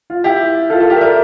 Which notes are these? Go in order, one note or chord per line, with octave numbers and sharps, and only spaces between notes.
F4
E4 G4
F4 A4
F4 A4
G4 A#4
E5
A#4 D5